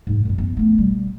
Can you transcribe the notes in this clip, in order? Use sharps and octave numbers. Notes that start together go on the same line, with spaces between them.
G#2 D#4
F#2 D#3
B3
A3 B3
B2 G3